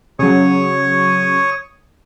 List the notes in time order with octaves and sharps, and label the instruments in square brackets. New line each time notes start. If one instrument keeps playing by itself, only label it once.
[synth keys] C#3 F#3 [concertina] C#5 C#6 D#6